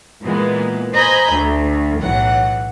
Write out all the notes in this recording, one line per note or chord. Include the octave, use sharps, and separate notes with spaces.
A#2 E3 G#3 B3
C5 D#5 G#5 A#5 B5 G6
D2 A4
B1 A2 E3 F#3 F#5